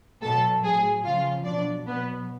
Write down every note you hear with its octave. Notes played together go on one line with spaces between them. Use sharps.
B2 F#3 A4 A5
A2 F#3 G#4 G#5
C#3 F3 F4 F5
B2 D4 D5
F#3
B2 F#3 B3 B4